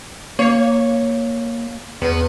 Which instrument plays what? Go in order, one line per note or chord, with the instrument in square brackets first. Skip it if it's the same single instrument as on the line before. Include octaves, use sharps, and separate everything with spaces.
[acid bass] A#3 [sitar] C#5
[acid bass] E2 [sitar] B3